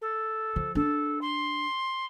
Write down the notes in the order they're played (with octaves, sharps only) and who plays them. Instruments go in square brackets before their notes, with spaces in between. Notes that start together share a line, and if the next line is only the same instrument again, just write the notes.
[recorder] A4
[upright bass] F3
[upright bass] D4 [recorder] A4
[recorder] C6